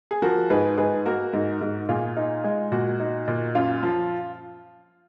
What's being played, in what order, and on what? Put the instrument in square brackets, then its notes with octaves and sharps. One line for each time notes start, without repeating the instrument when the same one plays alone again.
[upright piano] G#4
F3 F#4 A#4
G#2 G#4 B4
G#2 G#4 B4
A#3 F#4 A#4
G#2
G#2
A#2 F4 G#4
D#4
G#3
A#2 F#4
D#4
A#2
F#2 F4
F3